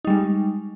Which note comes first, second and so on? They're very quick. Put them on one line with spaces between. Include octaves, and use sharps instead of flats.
D#4 G3 G#3